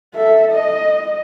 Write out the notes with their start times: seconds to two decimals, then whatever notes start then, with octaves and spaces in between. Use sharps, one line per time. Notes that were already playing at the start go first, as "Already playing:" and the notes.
0.15 A4 E5
0.51 D#5